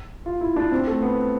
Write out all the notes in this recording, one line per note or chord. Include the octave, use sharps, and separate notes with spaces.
F4
E4
D4
C4
A3
B3